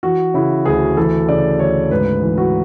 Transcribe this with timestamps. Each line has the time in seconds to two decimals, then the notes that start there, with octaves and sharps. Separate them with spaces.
0.03 E3 F#4
0.34 C#3 E4
0.65 D2 G#4
0.97 E3 A4
1.29 C#3 D5
1.59 D2 C#5
1.91 G#2 B4
2.22 E3
2.38 F#4